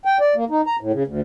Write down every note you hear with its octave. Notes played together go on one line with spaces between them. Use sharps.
G5
D5
A#3
D#4
A#5
A2
C#3
D2